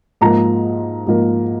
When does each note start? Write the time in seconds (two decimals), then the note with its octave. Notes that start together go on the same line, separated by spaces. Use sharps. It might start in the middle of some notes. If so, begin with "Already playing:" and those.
0.21 G#2 F3 A#3 A#5
1.07 G#2 F3 A#3